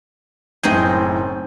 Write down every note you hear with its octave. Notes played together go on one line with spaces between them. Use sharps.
F#1 A2 C4 D#4 G#4 G6